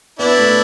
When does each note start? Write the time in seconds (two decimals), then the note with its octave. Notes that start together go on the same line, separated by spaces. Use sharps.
0.19 B3 D4 E4
0.38 A3